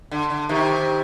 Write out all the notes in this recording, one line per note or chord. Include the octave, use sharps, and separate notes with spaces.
D3
D3
C3 D#3